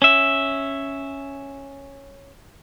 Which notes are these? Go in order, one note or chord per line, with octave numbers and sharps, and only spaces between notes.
C#4 E5